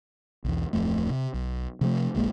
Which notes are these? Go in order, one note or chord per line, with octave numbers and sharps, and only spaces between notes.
B1 E2
D1 F2 A3
C3
B1
C3 F3 G#3 A3
F1 A#1 G#3 A#3